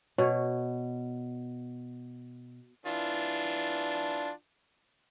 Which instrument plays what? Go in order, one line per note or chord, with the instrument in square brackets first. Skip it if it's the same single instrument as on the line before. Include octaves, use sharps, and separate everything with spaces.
[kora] B2 [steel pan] C#5
[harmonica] E3 D4 F4